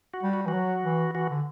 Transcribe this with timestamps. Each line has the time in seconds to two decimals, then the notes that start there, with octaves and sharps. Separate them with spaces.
0.14 F#4
0.23 G3
0.33 F#4
0.46 E3 F#4
0.54 F#3
0.84 E3
1.15 E3 F#4
1.30 D3